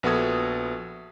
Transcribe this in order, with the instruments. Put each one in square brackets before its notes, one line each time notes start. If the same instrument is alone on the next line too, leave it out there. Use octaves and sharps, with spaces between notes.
[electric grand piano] A#1 B3 F#4 A4 D#6 G#6